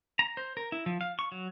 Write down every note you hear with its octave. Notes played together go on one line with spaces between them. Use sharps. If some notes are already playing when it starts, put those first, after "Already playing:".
A#5
C5
A#4
E4
F3
F5
C#6
F#3